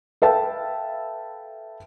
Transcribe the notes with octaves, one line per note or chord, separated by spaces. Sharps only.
A4 B4 E5 F5 G5 A5